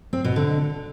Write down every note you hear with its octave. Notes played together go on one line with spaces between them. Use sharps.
C4
B2
D3